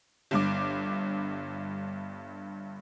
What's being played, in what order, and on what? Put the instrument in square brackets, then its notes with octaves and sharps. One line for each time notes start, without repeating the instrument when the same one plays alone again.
[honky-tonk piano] G1 G2 D6